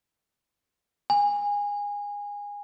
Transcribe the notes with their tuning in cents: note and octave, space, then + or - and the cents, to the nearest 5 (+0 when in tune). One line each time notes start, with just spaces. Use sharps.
G#5 -20